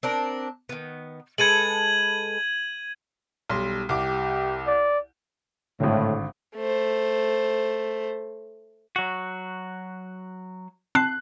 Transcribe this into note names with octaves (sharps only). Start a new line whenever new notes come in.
C4 D4 A#4
D#3 B3
G#3 A4 B4 G#6 D#7 F#7
B1 G3 C6
C2 G4 D6
D5
G#1 A2 D3
A3 C5
F#3 F#4
C4 A5 F#6 C7